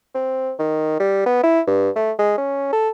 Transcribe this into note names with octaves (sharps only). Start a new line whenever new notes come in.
C4
D#3
G3
B3
E4
G2
A3
G#3
C#4
A4